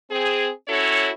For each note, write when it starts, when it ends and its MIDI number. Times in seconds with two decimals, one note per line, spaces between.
0.10 0.50 60
0.10 0.50 68
0.68 1.10 61
0.68 1.10 64
0.68 1.10 66
0.68 1.10 69
0.68 1.10 73